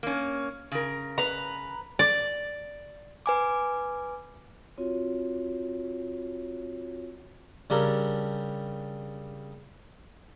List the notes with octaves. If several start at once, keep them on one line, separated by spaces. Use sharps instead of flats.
A#3 C#4
C#3 A#4
B4 A#5
D5
B4 G#5 D6
C4 F4 F#4 C#5
C#3 G3 D4 G4 A4 A#4